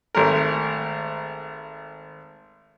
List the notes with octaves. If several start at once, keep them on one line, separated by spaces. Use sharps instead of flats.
G#1 A3 A#4